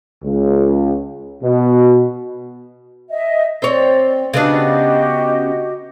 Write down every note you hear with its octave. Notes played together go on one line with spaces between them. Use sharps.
C#2
B2
D#5 E5
C4 C#5 D5
C#3 B3 D4 F#4 G4 D#5